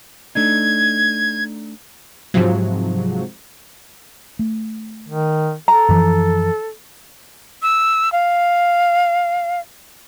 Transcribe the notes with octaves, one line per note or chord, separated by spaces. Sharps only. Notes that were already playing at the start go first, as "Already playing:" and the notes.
A3 D4 D#4 G#6
G#2 C3 F3 F#3
A3
D#3
A4 A#5
F#2 E3 F3
E6
F5